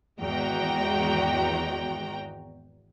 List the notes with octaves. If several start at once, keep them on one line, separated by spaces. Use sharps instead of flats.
G#1 E2 G#3 F#4 G5 A#5